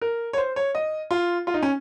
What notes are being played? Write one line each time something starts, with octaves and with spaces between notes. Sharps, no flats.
A#4
C#5
C5
C#5
D#5
F4
F4
D#4
C#4